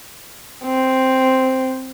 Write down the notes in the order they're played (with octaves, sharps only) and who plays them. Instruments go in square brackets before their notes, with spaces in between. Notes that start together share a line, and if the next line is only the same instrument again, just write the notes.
[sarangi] C4